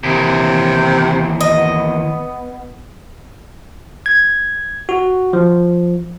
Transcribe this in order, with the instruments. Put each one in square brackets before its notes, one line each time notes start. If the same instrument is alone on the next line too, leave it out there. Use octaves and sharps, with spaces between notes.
[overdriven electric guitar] D#2 E3 [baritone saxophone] C3
[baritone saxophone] B3 [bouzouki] D#5
[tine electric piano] G#6
F#4
F3